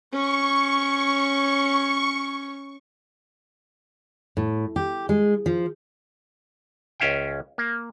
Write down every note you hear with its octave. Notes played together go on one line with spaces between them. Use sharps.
C#4 C#5 C#6
A2
G4
G#3
F3
C#2 C#4 E5 F5 G5
A#3